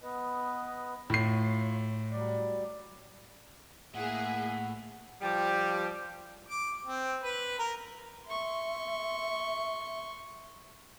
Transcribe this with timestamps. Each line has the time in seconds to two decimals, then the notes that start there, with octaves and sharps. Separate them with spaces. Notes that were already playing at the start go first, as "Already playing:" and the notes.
0.03 B3 B4 D#5
1.10 A2 F4 C#5 C7
2.12 F#3 G3 D5
3.95 A2 A#3 E4 G#4 F#5
5.21 F3 G3 G4
6.49 D6
6.86 C4
7.24 B4
7.59 A#4
8.27 E5 C6 C#6